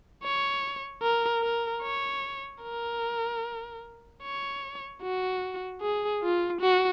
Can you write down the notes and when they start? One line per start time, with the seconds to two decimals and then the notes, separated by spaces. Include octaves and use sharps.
0.23 C#5
1.03 A#4
1.43 A#4
1.82 C#5
2.63 A#4
4.23 C#5
5.03 F#4
5.82 G#4
6.23 F4
6.61 F#4